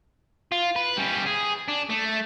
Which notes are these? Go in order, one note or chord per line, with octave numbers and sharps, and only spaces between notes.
F4
B4
G3 C#4
G#4
D4
A3